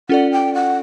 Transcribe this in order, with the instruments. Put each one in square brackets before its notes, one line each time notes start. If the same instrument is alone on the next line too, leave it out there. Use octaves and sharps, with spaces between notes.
[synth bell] C#4 F4 A4 D5 [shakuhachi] F#5
[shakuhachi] G5
F#5